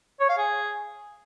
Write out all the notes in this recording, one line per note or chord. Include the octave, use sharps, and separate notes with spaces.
C#5
F5
G#4